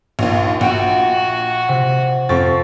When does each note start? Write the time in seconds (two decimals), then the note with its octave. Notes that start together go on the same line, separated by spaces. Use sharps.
0.19 A#1 D#2
0.61 A#1 F#4 F#5 G5
1.68 C3
2.29 F2 C4 C#6 A6